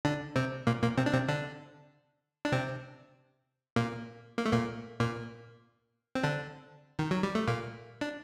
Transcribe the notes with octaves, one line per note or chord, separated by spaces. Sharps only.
D3 D4
C3 C4
A#2 A#3
A#2 A#3
C3 C4
D4
C3 C4
D3 D4
D4
C3 C4
A#2 A#3
A#3
A3
A#2 A#3
A#2 A#3
C4
D3 D4
D#3
F#3
G3
A3
A#2 A#3
D4